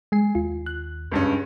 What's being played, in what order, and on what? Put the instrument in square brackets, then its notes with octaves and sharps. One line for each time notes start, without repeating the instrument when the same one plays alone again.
[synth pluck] G#3 G#5 C7
[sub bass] D#2 [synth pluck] F4
[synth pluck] F#6
[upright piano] C#2 G2 C#4